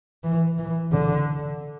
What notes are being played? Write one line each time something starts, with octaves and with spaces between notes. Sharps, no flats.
E3
E3
D3